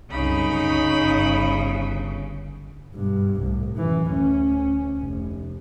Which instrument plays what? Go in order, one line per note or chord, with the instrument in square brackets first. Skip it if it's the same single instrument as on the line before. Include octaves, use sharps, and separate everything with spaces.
[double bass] C2 F#2 [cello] C#3 [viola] D#4 B5
[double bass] G1
G2 B2
C2 A2
F#2 E3
D2 C#4
F1